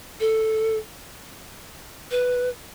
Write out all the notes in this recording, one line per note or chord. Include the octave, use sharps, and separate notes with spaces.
A4
B4